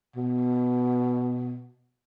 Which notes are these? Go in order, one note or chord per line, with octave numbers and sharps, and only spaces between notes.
B2